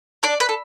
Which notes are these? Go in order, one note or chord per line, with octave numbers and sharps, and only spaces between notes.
D4 D5
B4
A4